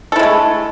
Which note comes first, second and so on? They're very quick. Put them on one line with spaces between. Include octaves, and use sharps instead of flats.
A4 E4 G#3 A3